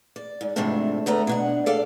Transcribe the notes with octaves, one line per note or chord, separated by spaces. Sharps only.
D5
G#2
F2 G#2 C3 A3 C4 D4
D2 A3 B3 A#5
B2 D4 F#5
A4 D5 F5